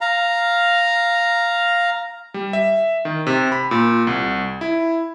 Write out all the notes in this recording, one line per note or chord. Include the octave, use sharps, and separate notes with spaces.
F5 A#5
G3
E5
D#3
C3
B5
A#2
C2
E4